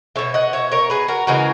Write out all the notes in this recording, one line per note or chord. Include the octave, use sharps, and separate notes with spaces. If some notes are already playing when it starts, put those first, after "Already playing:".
B2 G#3 C#5 E5
D#5 F#5
C#5 E5
A#4 C#5
G#4 B4
F#4 A#4
C#3 E3 G#3 F#4 A#4